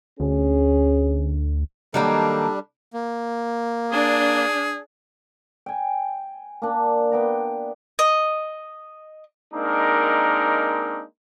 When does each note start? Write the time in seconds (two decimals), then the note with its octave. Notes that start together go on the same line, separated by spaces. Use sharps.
0.20 D2 C#4 G#4
1.94 D#3 F#3 G3 A#3 D4 A4
2.94 A#3
3.92 D4 G#4
5.66 G5 G#5
6.62 A#3 D4
7.12 B3 G5 A#5
7.99 D#5
9.53 G#3 A#3 C4 D4 D#4 A#4